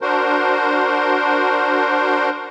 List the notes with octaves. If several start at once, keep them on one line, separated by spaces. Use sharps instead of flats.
D4 F#4 A#4 C5